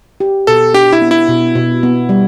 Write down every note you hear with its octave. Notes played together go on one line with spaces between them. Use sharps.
G4
B2 A4
D4 G4
E4
B3
E4
B2
B2
B3
G3